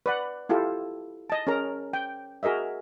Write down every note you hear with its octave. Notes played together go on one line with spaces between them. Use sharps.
B4 D5 F#5
E4 F4 G4 A4
D#5 A5
C#4 G#4 A#4 A#5
G5
F#4 G#4 A#4 D#5 E5